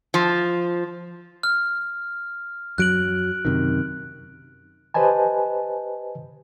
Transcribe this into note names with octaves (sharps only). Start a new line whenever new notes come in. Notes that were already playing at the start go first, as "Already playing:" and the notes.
F3
F6
F#2 F#3 F#6 D7 F#7
F#2 C3 D#3
G4 B4 C5 D#5 G#5 A5